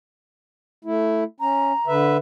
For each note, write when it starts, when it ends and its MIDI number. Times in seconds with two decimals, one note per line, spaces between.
0.85 1.24 57
0.85 1.24 64
1.40 1.72 61
1.40 1.93 82
1.87 2.17 50
1.87 2.17 71
1.87 2.17 76